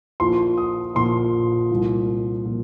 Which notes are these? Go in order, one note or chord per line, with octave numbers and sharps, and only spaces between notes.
A#1 A#2 F3 C6
D#6
A#1 A#2 F3 C6
C2 A#2 F3
A#2 F3